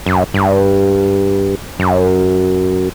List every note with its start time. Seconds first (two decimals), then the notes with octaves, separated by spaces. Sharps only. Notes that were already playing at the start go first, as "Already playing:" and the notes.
0.06 F#2
0.34 G2
1.79 F#2